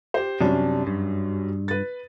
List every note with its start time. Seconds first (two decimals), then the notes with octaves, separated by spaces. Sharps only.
0.14 G4 C5
0.41 F#2 C3 G3 C#4 D4
0.87 G2
1.68 B4 A6